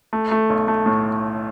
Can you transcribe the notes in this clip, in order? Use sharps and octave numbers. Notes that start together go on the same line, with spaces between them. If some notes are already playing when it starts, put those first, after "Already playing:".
A3
A3
B1
A3
A2